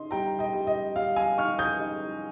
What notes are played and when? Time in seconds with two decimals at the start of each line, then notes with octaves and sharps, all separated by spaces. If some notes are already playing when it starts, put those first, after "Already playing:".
Already playing: C#3 D#4 C6
0.11 G3 G5 A#5
0.39 D#5 G5
0.54 G3
0.67 D#5
0.96 G3 F5
1.16 F5 G#5
1.37 D#4 C#6 F6
1.59 D#6 G6
1.80 D#4